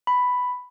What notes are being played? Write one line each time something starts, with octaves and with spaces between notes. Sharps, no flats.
B5